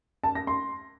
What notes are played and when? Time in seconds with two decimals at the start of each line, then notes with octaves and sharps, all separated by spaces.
0.24 A5
0.35 A#6
0.47 C6